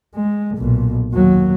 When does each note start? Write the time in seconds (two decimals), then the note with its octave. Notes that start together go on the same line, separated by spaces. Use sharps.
0.15 G#3
0.56 B1 A#2
1.13 D#2 F#3